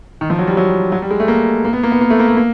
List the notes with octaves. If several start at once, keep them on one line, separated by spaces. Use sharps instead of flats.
D#3
F3
F#3
G3
F#3
F#3
G3
G#3
A3
A#3
A#3
B3
A#3
B3
A#3
A3
A#3
A3
A#3